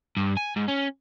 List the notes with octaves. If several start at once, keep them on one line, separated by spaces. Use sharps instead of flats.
G2
G#5
G#2
C#4